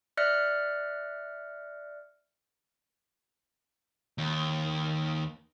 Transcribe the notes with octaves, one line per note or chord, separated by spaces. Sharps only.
D5 E5 F6 F#6 A#6 C#7
D#2